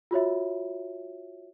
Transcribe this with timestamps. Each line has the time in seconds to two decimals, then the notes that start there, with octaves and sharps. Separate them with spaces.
0.11 F4 F#4 C#5 E5